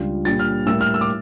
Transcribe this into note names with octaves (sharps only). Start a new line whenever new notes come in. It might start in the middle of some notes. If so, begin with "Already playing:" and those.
Already playing: C#2 C#3 G3 D4 F4
A#2 G3 D4 A6
F6
A2 G3 A#3 E6
F6
E6
D6